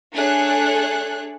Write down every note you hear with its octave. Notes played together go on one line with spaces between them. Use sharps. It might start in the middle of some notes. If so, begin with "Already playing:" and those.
A3 D4 G#4 A4 C#5 F#6